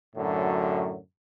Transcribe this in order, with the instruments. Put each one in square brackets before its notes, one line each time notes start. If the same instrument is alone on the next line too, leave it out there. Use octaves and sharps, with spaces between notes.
[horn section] F#2 A2 D3 F#3